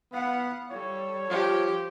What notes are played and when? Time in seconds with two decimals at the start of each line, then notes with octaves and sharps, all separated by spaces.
0.13 B3 F5 F#5
0.71 G3 A4 C#5
1.30 F3 G4